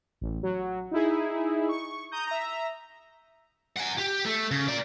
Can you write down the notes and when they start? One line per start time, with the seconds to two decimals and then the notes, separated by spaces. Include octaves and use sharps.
0.21 A1
0.43 F#3
0.91 D#4 E4 G#4
1.69 C#6
2.12 A#5 D#6 G6
2.27 E5 A#5
3.76 F#5 G#5
3.98 G4
4.25 A3
4.51 C#3
4.68 A#3 D5